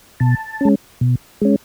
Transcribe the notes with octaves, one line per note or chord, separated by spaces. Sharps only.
B2 A5
G#3 C#4
B2
G#3 C#4